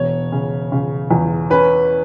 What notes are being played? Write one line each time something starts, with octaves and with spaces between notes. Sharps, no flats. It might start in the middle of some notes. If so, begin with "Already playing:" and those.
Already playing: E1 C#5
C#3
C#3
E2
C#4 B4